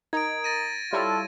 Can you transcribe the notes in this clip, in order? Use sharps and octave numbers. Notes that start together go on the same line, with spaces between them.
D#4 A#4 A#5 D#6 G#6 D7
A6 A#6 D#7
G3 E4 F4 A4 C#5 F5 A5 C6